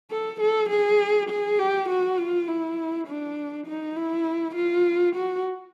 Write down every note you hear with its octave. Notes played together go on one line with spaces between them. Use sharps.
A4
A4
G#4
G#4
G4
F#4
F4
E4
D4
D#4
E4
F4
F#4